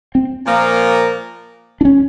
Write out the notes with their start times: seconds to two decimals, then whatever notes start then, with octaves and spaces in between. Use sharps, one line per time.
0.15 C4
0.45 A#2 F3 A#3
1.81 D4
1.85 C#4